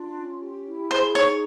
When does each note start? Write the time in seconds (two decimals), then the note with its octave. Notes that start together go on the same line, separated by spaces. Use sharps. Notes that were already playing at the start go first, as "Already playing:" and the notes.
Already playing: D4 F4
0.17 C#4
0.41 G4
0.66 E4
0.90 G#4 C5
1.15 D#4 C#5